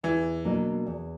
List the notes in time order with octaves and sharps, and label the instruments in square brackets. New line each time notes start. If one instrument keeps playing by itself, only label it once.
[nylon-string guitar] E2 [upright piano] E3
[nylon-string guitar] B2 F#3 A#3 D4
E2